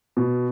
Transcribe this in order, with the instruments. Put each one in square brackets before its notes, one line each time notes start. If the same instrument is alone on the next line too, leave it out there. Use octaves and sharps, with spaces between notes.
[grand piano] B2